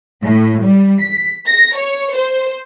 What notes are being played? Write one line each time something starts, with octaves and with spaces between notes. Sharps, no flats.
A2
G3
B6
A#6
C#5
C5